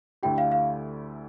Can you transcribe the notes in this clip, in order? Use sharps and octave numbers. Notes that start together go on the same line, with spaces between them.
D2 D3 A3 E4 G4 G5
F5
F5